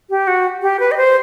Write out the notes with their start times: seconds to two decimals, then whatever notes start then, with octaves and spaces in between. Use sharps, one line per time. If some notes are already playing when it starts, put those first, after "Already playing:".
0.10 G4
0.27 F#4
0.62 G4
0.80 B4
0.91 D#5
0.97 C5